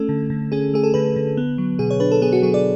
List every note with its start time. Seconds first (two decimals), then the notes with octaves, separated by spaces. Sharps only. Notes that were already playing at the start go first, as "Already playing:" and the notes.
Already playing: A3 C#4 A4
0.09 D3
0.30 D3
0.52 C#4 G#4
0.74 A3 G#4
0.84 A4
0.94 D3 B4
1.16 D3
1.37 B3
1.58 F#3
1.79 B2 G#4
1.90 C#5
2.00 D4 B4
2.11 A4
2.22 B3 G#4
2.33 F#4
2.42 F#3 G#4
2.54 D5